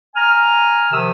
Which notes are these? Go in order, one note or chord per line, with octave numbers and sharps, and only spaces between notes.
G#5 A#5 F6
C3 D#3 F3 D#6 E6